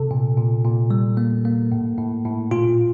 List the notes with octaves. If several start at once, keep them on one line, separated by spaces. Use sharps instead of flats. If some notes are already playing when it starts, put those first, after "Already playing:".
Already playing: C3 A4
A#2
A#2
A#2
G3
A#3
A#3
A2
A2
A2
A#2 F4